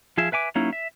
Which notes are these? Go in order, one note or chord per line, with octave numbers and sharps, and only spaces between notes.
F3 F4 G#4 E5
B4 E5 G#5 D6
F#3 A#3 C#4 D#4 E4
E5